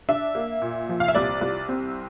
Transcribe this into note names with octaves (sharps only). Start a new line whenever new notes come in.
D4 E5
A#3
A#2
F3
F5
E5
C2 D5
C2
C4